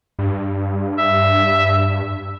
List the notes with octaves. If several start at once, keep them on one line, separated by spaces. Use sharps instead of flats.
G2
E5